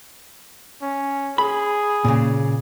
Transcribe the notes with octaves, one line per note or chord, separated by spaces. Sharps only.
C#4
G#4 B5
A#2 C#3